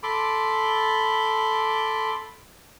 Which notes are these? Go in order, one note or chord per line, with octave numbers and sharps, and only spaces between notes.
A4 B5 C6 D6